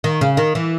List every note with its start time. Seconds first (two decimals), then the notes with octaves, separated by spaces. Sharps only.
0.04 D#3
0.21 C#3
0.37 D#3
0.55 E3